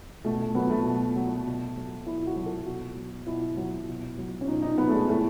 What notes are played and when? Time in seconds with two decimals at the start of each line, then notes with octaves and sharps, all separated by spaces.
0.25 B2 A3
0.40 A3
0.55 F#3 B3
0.70 A3
0.85 B2
1.16 F#3
1.46 B2
1.76 F#3
2.06 B2 E4
2.27 F#4
2.36 F#3
2.46 A4
2.66 B2 F#4
2.96 F#3
3.27 B2 E4
3.57 F#3
3.88 B2
4.18 F#3
4.41 C#4
4.48 B2 D#4
4.62 D#4
4.78 F#3 B3
4.89 A3
4.93 G#3
5.09 A2 A3